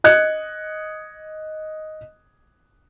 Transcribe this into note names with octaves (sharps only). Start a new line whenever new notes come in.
D#5 F#6 G#6 C#7